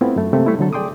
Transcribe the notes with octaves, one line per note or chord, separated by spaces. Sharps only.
A3 B3 C4 E4 F4
F#2 A3
C3 A3 A#3 C4
G3 A3 E4
D3 F#3 A4
G#4 D5 G5 C6 D6 D#6